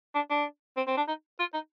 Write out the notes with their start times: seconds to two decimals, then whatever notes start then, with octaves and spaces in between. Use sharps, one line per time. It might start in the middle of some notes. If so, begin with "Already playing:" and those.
0.15 D4
0.30 D4
0.77 C4
0.87 C4
0.97 D4
1.08 D#4
1.39 F4
1.54 D#4